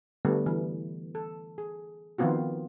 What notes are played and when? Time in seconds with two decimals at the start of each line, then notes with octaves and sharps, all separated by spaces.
0.25 D3 G3 A3 B3
0.46 E3
1.15 A4
1.58 G#4
2.18 D#3 F3 B3 C4 F4 F#4